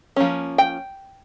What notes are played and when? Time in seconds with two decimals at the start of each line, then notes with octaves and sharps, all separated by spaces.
0.16 F3 A#3 C#4
0.58 G5